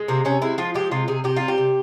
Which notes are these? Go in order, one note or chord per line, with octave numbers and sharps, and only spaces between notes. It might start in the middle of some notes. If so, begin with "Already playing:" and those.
Already playing: G#3
C3 A#3
C3 C#4
G#3 E4
F3 F4
G#3 G4
C3 F4
C3 G#4
C3 G4
G3 F4
G4
C3